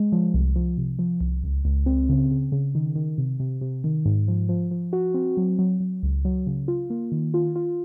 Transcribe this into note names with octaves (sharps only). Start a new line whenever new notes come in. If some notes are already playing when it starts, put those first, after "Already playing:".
Already playing: G#3
F3
C2
F3
C3
F3
C2
C#2
C#2
C4
C#3
C#3
C#3
D#3
D#3
C3
C3
C3
D#3
G#2
F3
F3
F3
F#4
C4
F#3
F#3
F#3
C#2
F#3
C#3
F4
A#3
D#3
F4
F4